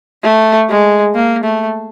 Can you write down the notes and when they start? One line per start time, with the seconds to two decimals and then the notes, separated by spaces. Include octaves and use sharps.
0.24 A3
0.69 G#3
1.15 A#3
1.44 A3